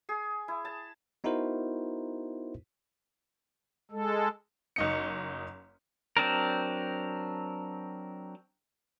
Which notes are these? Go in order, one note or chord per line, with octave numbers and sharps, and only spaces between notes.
G#4
E4
A5
B3 D#4 E4 F#4 A#4 C5
G#3 A4
F#1 D#4 C#7
F#3 C4 D4 A#4